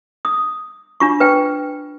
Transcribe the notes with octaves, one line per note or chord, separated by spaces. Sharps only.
D#6
D4 F4 C#6
B4 G5